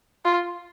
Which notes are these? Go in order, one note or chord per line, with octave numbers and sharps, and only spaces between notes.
F4